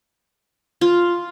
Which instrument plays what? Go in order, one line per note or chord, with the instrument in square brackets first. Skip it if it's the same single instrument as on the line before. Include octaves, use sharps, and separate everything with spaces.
[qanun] F4